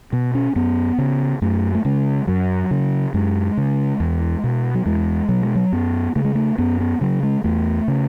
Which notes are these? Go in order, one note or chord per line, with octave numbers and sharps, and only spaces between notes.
B2 B3
C#4
F#2 B3
C#3
F#2 A3
A3
C#3 G#3
F#2 F#3
C#3
F#2 G#3
C#3
E2
B2
F#3
E2 G#3
B2 F#3
G#3
F#3
F#2 B3
C#3 A3
G#3
A3
F#2 B3
B3
C#3 F#3
G#3
E2 A3
C#3